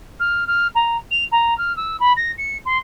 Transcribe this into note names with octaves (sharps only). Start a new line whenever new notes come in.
F6
F6
A#5
F7
A#5
F6
E6
B5
A#6
C#7
C6